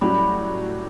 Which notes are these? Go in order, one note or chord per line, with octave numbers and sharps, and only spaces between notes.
A2 F#3 G3 C#4 F#4